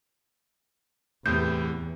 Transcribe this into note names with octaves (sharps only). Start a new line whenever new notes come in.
E2 A2 C3 B3 G6